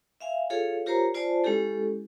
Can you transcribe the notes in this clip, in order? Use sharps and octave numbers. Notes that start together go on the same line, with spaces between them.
E5 F5 G#5
F4 G#4 A4 C#5 F5
F4 G4 A#4 C5 C#5 A#5
F4 C5 D5 G#5 A5
G#3 C#4 E4 G4 A4